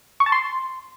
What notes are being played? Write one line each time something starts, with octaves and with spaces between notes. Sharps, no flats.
C#6
A5
C6